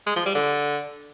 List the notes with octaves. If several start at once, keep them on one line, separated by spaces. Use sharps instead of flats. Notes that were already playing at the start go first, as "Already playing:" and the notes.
G#3
F3
G3
D3